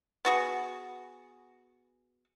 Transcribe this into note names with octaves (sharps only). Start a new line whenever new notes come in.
B3 F#4 G#4